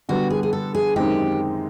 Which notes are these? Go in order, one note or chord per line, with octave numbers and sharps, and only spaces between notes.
D3 G3 B3 F#4
G#4
G#4
A4
G#4
F#2 D#3 G#3 C4 D#4 G4